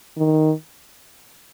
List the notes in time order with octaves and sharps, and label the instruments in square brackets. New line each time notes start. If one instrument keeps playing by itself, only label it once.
[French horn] D#3